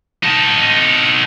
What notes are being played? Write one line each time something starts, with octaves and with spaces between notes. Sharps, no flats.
D#4 A4